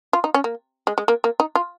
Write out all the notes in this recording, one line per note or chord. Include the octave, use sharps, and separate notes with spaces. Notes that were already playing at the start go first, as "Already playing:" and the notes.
F4
D#4
C#4
A#3
G#3
G#3
A#3
A#3
D#4
F4